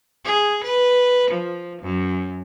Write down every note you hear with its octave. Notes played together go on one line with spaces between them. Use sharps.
G#4
B4
F3
F#2